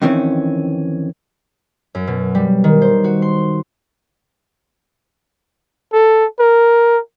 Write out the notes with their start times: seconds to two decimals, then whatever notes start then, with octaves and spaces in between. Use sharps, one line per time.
0.02 F2 D#3 E3 C4 C#4
1.95 F#2
2.07 B2
2.35 G3
2.64 D#3
2.82 C5
3.04 F#4
3.22 C6
5.93 A4
6.39 A#4